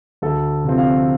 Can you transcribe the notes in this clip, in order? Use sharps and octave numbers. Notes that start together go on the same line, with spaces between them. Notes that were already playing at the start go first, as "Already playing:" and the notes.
D2 A4
C3 F3 C4
F5